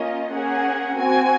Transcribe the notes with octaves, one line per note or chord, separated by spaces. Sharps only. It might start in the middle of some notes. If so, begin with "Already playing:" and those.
Already playing: A#3 C#4 F4 D#5
A#3 C#4 G#4 F#5
C4 F#4 G#5